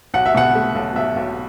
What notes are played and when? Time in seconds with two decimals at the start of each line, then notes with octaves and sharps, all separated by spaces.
0.14 B1 F#5
0.26 E5
0.35 B2 F#5
0.55 A3
0.75 B1
0.96 B1 E5
1.16 B1